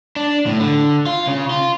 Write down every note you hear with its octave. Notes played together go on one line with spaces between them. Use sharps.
D4
A2
D3
F4
C#3
F4